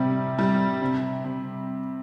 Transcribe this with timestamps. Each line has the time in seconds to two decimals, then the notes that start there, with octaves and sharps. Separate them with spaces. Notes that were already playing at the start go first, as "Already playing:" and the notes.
Already playing: C3 G3
0.38 G3
0.82 C3
1.24 C3